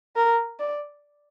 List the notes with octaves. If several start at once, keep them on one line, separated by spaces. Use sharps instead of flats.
A#4
D5